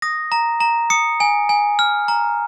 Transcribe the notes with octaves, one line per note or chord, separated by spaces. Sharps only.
D#6 A#6
A#5
A#5
D#6 C#7
G#5
G#5
F6
A#5